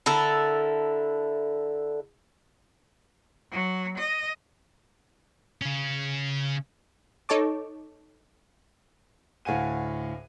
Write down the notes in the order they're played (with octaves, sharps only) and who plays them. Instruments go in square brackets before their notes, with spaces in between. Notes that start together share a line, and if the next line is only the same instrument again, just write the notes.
[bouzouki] D3 E4 A4 A#4
[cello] F#3
D#5
[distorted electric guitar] C#3 C#4
[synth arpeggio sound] D#4 A4 C#5 A5 D6
[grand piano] D2 A2 F5 F#5 G#5 D#7